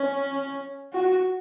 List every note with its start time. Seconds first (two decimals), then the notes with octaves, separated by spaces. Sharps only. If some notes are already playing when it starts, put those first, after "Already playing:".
Already playing: C#4
0.93 F#4